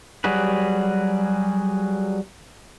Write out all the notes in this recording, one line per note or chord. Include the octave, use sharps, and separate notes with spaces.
F#3 G3 F#4 G#4 B4